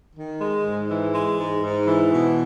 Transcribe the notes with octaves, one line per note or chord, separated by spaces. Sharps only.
D#3
G#3
G#2
E3
G#3
G#2
G#2
E3
B2